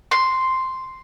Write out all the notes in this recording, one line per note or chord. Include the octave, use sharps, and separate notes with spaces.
C6